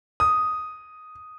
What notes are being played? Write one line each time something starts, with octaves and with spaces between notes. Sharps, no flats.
D#6